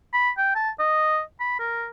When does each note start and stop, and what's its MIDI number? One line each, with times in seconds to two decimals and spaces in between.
0.13 0.30 83
0.38 0.51 79
0.55 0.70 81
0.79 1.20 75
1.40 1.55 83
1.59 1.88 70